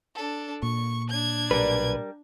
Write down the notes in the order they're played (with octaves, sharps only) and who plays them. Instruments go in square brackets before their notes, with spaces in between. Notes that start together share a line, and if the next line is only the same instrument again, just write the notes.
[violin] D4 A4
[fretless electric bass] A#2 [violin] C#6
[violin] D4 G#6
[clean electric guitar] B1 B4 [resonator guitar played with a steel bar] G3 A#4